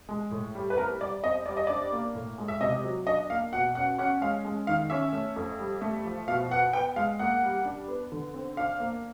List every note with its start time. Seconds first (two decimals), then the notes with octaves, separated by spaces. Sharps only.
0.09 G#3
0.31 A2
0.55 G3
0.70 B4
0.78 C4 A#4
1.00 G3 D5
1.24 C4 D#5
1.46 G3 D5
1.57 D#5
1.67 D4 D5
1.92 A#3
2.15 A2
2.38 G#3
2.48 E5
2.61 C3 D#5
2.84 F#3
3.07 D4 D#5
3.30 A#3 F5
3.53 B2 F#5
3.75 C#4 F#5
3.98 C#4 F#5
4.21 G#3 F5
4.45 G#3
4.67 D#3 F5
4.90 C#4 E5
5.13 A3
5.36 F2
5.59 G3
5.81 A3
6.05 F3
6.28 B2 F5
6.51 B3 F#5
6.73 B3 G5
6.96 G#3 F5
7.19 A#3 F#5
7.43 G3
7.65 D4
7.88 B3
8.12 D3
8.34 C4
8.57 D4 F5
8.80 A#3